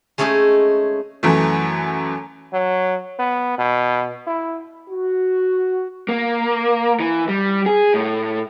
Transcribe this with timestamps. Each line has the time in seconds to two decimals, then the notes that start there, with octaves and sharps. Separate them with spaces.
0.18 G#3 A3 C#4 D#4 G#4
1.23 F#2 E3 A3
2.53 F#3
3.19 B3
3.58 B2
4.27 E4
4.89 F#4
6.09 A#3
7.00 E3
7.28 G3
7.66 G#4
7.94 A2